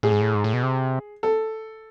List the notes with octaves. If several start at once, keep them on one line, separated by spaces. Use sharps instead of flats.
A2 G#4
G#2
A2
G#2
A2
B2
C3
A4